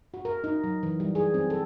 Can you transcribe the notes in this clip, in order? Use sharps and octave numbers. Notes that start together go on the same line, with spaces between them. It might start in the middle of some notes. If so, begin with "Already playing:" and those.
F#4
A#4
D#4
F#3
E3
G3
G#4
C4
A4